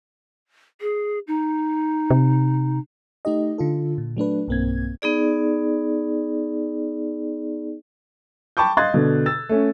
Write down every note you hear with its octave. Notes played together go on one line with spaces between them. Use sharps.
G#4
D#4
C3
A3 D#4 G4 D#5
D3 F4 A4
A#2
F#3 A3 D4 B4
B1 G2 A#3 C4 G#6
B3 D#4 G#4 D5
G5 A5 B5 C#6 D6 G6
D#5 F5 C6 F#6 G#6 A6
B2 D3
E6 A6
A3 C#4